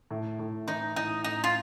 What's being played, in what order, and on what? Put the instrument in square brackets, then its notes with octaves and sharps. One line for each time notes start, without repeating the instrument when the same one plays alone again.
[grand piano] A2
A2
[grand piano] E3 [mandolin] D#4
[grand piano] A2 [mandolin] D#4
[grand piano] A2 [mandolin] D#4
[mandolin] F4